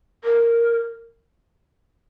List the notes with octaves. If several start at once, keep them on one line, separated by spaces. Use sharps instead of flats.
A#4